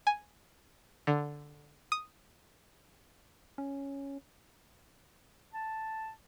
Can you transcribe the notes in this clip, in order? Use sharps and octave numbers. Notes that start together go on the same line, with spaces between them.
G#5
D3
D#6
C#4
A5